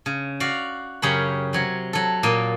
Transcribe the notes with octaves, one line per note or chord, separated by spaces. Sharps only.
C#3
F#4 D5 F5
F#2 C#3 C#4 G4 C#5 B5
C3 F#3 C#5
F#3 A4
A#2 A#3 D#5